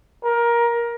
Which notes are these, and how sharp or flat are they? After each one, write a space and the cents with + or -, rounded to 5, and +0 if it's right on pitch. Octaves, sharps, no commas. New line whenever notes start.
A#4 +20